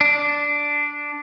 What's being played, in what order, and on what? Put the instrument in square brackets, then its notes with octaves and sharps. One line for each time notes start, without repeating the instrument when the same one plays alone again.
[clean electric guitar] D4